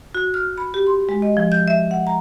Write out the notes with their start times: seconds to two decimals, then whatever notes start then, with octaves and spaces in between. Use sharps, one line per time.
0.15 F#4
0.34 F6
0.58 B5
0.74 G4
0.87 C6
1.09 G#3
1.22 D#5
1.37 F3
1.52 G6
1.68 E5
1.91 F#5
2.07 A#5